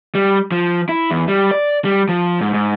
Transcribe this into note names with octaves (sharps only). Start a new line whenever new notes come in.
G3
F3
E4
E2
G3
D5
G3
F3
G#2
G#2